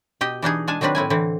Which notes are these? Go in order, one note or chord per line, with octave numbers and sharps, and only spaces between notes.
B2 G4 D#5
E3 D4 D#4 G#4
G#3 D4 G#5 A5
D#3 F#3 C4 D4 B4
A2 C4 E4 G#5
D3 E3 C4